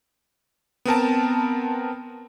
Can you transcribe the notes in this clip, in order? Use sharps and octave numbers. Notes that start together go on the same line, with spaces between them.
B3 C4 A#4 A5